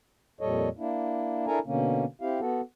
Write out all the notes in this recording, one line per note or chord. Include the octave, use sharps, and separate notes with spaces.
F2 A#2 G3 A4 C#5 D#5
A#3 D4 E4
D4 E4 A4 A#4 G#5 A#5
B2 D3 A#3 C#4
C4 E4 G4 F5
B3 F#4 A4